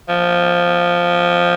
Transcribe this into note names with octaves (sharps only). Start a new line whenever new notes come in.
F3